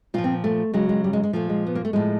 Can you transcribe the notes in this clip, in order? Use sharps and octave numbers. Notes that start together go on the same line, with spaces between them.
A#2 F3 F4
C4
A3
C#3 F#3 G#3
G#3
G3
G#3
G#3
A#2 F3 A3
G#3
B3
A#3
A3
A2 F3 G#3